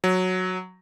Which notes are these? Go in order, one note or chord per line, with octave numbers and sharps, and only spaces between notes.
F#3